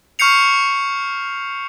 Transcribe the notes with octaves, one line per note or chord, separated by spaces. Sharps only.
C#6 F6 G6 C7 C#7 F7